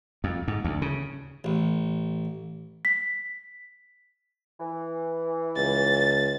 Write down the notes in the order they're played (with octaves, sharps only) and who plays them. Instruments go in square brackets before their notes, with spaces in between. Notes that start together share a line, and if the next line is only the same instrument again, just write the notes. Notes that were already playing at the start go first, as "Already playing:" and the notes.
[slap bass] F2
G#2
D2
C#3
[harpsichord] A1
[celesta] B6
[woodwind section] E3
[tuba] C#2 [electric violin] A6